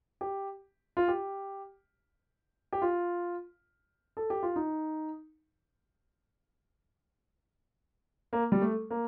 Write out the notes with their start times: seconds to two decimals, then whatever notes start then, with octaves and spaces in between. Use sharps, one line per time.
0.21 G4
0.97 F4
1.08 G4
2.73 G4
2.82 F4
4.17 A4
4.30 G4
4.43 F4
4.56 D#4
8.33 A#3
8.52 G3
8.61 A3
8.90 A#3